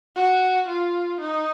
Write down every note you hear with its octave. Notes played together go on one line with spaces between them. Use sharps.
F#4
F4
D#4